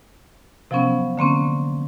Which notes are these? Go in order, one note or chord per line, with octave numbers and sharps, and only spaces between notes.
C3 F3 F#3 B3 C#4
D3 A#3 C4 C#4